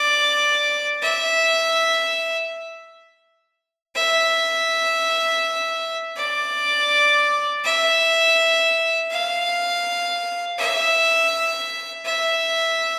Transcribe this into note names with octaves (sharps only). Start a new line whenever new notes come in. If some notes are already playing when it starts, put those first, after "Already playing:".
Already playing: D5
E5
E5
D5
E5
F5
E5
E5